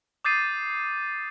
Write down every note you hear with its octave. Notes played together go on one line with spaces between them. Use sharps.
D6 D#6 G6 A6 C7 D#7